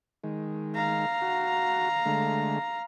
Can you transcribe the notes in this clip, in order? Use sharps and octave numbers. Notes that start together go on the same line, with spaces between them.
D#3 G#3
F5 A#5
F#4
D3 G#3 A3